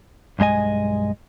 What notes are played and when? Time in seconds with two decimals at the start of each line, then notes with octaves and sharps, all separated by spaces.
0.39 B1 G2 G#3 D#5 G#5